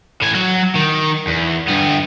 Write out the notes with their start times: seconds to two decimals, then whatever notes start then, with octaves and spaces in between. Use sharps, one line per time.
0.22 A2 G#5
0.35 F#3 F#4
0.76 D#3
1.27 E2
1.67 G2 B3